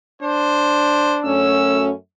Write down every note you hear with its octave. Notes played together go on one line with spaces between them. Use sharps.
D4 C5
F#2 A3 C#4 E6